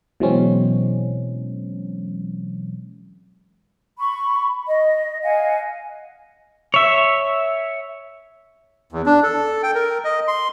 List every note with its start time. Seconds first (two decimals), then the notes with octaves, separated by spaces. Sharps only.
0.20 B2 E3 F#3 G#3 C4 C#4
3.99 B5 C#6
4.67 D#5
5.22 D#5 F5 F#5 G#5
6.74 C#5 E5
8.92 E2
9.06 D4
9.23 A4
9.63 G5
9.75 A#4
10.04 D#5
10.28 C6